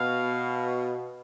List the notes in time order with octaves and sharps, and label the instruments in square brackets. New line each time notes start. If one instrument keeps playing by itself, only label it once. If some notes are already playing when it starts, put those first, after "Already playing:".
Already playing: [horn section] B2 [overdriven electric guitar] F5